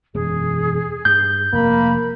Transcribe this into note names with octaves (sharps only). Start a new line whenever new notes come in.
E1 F#2 G#4
G2 G6
F1 A#3 B5